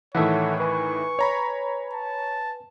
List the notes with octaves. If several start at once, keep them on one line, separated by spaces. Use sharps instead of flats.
A2 D#3 E3 A4 C#5 E5 F#5
B4 G#5 C#6
C#5 A#5 B5
A5